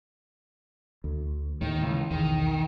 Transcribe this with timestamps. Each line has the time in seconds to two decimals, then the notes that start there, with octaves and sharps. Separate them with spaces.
1.04 D2
1.61 D#2 A2 D#3
1.82 C#2 E3
2.11 B1 E2 D#3